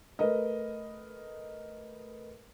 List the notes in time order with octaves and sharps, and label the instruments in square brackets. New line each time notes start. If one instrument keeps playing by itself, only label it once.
[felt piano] A3 A#4 B4 D#5